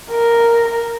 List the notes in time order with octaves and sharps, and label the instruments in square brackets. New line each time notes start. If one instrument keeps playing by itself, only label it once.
[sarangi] A#4